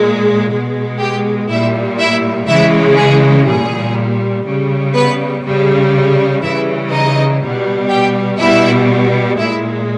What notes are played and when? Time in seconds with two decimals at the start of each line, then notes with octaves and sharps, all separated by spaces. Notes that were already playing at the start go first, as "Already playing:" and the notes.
Already playing: A#2 G#3
0.50 B2 G#3
0.99 G4 G5
1.48 A#2 G3 E4 E5
1.98 E4 E5
2.47 C#3 E3 G#3 E4 E5
2.96 G#4
3.46 A#2 G3 G#4
4.44 C#3 G3
4.94 B3 B4
5.43 C#3 G3
6.42 C#3 E3 G3 E4 E5
6.91 D#4 D#5
7.40 B2 G3
7.89 G4 G5
8.38 B2 G3 E4 E5
9.37 A#2 G#3 E4 E5